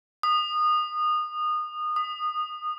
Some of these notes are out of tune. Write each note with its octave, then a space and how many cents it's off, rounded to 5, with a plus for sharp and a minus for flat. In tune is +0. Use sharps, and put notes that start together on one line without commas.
D#6 -25
D#6 -15